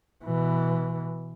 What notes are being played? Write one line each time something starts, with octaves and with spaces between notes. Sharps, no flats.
B2 E3